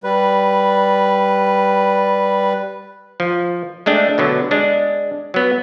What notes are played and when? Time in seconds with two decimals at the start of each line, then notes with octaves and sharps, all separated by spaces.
0.04 G3 B4
3.20 F3
3.86 G#3 A3 D4 G5
4.18 B2 D3 F#3
4.51 G#3 D4
5.34 F#3 B3